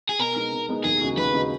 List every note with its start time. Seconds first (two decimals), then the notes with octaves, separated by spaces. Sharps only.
0.09 G#4
0.19 B2 A#4
0.35 G#3 B3 D#4
0.52 B2
0.69 G#3 B3 D#4
0.84 D#2 G#4
1.01 C#3 G#3 D#4 F#4
1.17 D#2 B4
1.34 C#3 G#3 D#4 F#4